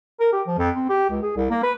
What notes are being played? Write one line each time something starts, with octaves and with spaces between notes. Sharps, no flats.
A#4
G4
F3
F2
C4
G4
C#2
G#4
C2
A#3
B4